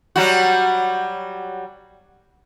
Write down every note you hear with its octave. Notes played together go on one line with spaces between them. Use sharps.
F#3 G3 F#4